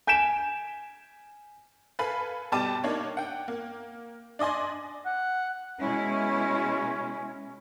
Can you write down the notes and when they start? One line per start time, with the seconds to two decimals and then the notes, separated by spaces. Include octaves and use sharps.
0.07 G#5 G6 B6 D7 E7
1.99 A4 B4 F5 G#5 B5
2.52 B2 G3 G4 A5 D6 D#7
2.84 A#3 D4 D#4 C#5
3.17 F#5 G5
3.48 A#3
4.39 D4 D5 D#5 G#5 C6
5.06 F#5
5.79 B2 G#3 C#4 E4